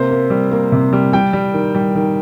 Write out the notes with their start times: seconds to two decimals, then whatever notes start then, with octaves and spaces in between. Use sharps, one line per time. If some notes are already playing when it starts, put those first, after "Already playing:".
Already playing: C3 A#3 C5
0.11 A#3
0.30 G3
0.52 A#3
0.72 C3
0.93 G3
1.13 G3 G5
1.33 G3
1.54 D#3
1.75 G3
1.95 D#3